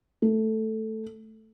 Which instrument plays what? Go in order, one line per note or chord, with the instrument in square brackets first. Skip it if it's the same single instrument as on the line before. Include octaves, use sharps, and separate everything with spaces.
[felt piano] A3